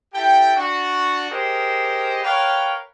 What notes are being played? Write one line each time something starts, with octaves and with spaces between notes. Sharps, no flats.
E4 G4 A4 G5
D4 F#4
G4 G#4 A#4 C5 D#5
A#4 B4 C#5 F5 G5